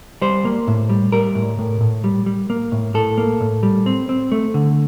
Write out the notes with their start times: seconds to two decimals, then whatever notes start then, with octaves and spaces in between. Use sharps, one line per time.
0.22 G3 C5
0.45 A#3
0.68 A2
0.89 G3
1.12 G3 A#4
1.35 A2
1.59 A2
1.81 A2
2.04 G3
2.26 G3
2.50 A#3
2.72 A2
2.94 A2 A4
3.18 A#3
3.40 A2
3.63 G3
3.86 C4
4.09 C4
4.32 A3
4.54 D3